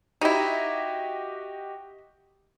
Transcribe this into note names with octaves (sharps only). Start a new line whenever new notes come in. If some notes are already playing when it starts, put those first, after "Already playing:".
D#4 E4 F#4 G4 D#5